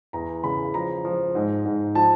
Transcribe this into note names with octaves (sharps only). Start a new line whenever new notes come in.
E2 A#5
C#3 B5
F3 A#5
F3
G#2
G#2
F3 A5